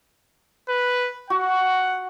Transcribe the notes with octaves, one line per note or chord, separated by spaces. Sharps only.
B4
F#4 F#5